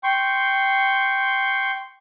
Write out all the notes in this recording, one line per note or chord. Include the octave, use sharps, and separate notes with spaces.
G5 C6 C#6